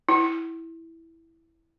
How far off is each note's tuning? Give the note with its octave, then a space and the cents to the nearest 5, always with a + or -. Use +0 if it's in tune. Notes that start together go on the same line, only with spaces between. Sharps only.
E4 -5